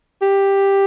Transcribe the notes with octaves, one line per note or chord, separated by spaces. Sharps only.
G4